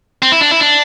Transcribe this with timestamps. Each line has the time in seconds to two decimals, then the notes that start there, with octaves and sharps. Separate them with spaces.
0.22 C4
0.32 E4
0.41 D4
0.51 E4
0.60 D4